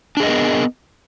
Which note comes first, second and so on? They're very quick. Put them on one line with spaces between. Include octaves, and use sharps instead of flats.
D4 G#4 D#5 A#4 B3